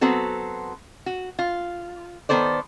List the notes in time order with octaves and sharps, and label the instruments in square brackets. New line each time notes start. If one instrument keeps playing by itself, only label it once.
[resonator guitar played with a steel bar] F#3 B3 C4 F#4 A4
F#4
F4
D#3 G3 B3 A4 C5 D5